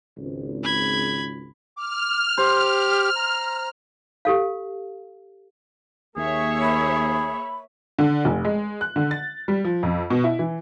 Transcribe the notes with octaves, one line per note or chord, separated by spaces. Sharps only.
G#1 C#2
B5 G#6
D6 F6
G4 C5
A#5
G4 A4 F5
D#2 A#3 G#4 C#5 E5
B5
D3
F1
G#3
F#6
D3
A6
G3
F3
F2
B2
E4
E3